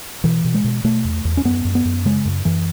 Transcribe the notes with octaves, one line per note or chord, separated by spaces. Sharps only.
B2 E3
B2
G#3
B2
B2 A3
E2
E2
C#4
F#2 B3
F#2
B3
F#2
C#3 G#3
F#2
F#2 E3